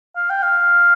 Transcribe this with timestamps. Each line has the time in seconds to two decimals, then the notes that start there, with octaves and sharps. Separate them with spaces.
0.16 F5
0.30 G5
0.43 F5